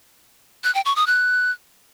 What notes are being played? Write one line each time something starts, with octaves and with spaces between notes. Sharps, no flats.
F#6
G5
C#6
D#6
F#6